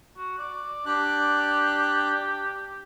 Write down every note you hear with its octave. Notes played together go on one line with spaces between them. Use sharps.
F#4
D5
D4 G4 F#6